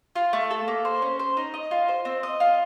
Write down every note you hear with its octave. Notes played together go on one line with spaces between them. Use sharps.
F4
A3
A4
A#3
C5
C#4
C5
D#4
D#5
F4
C5
C4
D#5
F4